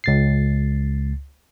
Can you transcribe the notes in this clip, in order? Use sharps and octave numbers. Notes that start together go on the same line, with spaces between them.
C#2 A6 C7